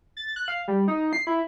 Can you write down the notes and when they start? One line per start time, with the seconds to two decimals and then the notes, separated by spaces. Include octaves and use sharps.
0.17 A6
0.36 F#6
0.48 F5
0.68 G3
0.88 D#4
1.13 C7
1.27 E4